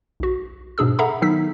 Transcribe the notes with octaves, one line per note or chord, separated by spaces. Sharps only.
B1 F#4
G#2 B2 D4 G#4 E6
G#4 A4 E5 F#5 A#5 B5
D#3 F#3 B3 D#4 E6 B6